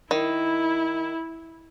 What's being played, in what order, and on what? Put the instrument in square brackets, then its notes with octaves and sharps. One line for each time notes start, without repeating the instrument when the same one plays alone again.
[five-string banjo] D#3 [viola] E4